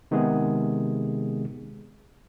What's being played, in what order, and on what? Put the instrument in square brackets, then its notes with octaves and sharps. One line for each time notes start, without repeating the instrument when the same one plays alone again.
[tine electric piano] C3 D#3 G#3 B3 G#4